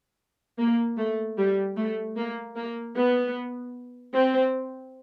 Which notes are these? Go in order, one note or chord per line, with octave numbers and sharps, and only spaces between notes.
A#3
A3
G3
A3
A#3
A#3
B3
C4